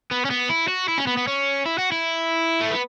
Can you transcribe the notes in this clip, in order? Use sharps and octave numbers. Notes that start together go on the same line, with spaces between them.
B3
C#4
B3
E4
F#4
E4
C#4
B3
B3
C#4
E4
F#4
E4
A3
B3